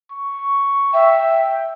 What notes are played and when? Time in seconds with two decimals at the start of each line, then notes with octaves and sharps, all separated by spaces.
0.12 C#6
0.94 E5 G5